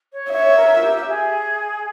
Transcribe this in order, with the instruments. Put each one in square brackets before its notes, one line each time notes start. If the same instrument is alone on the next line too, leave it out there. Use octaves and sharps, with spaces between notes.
[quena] C#5
[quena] C#5 [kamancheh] E5
[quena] A#4
F4
G4
G#4